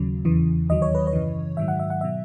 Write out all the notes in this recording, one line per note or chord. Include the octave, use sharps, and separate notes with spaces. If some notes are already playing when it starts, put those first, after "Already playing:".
Already playing: D#2 C#3 F#3
E2 C#3 E3
D#2 D#3 F#3 D#5
C#5
B4
C#5
F#2 C#3 E3
G#2 D#3 F#3 E5
F#5
E5
F#5
B2 F#3 E5